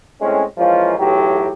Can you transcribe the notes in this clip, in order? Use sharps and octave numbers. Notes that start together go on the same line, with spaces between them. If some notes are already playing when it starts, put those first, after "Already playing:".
A2 G#3 C4 C#4
E3 F3 G#3 A#3 C#4 F4
B1 E2 A2 F#3 G4